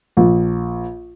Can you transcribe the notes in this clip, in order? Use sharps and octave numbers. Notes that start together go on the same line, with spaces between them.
A#1